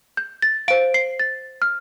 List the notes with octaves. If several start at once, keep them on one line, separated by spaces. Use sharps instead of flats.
G6
A6
C5 F5 D7
C7
A6
F6